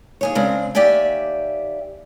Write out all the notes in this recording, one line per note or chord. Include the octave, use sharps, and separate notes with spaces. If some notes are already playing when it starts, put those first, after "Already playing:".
D#2 G#4 C#5
C#3 G#3 C4 D4
D#2 G4 D5 E5 G5 G#5